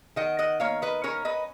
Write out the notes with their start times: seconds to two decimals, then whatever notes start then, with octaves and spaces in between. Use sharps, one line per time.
0.16 D#3 D#5 F#5
0.39 D#5 F#5
0.60 A#3 C#5 F5
0.82 B4 D#5
1.04 C#4 A#4 C#5
1.25 B4 D#5